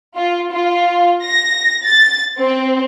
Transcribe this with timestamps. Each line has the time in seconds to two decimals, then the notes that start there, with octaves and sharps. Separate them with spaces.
0.16 F4
0.51 F4
1.23 A#6
1.84 A6
2.39 C4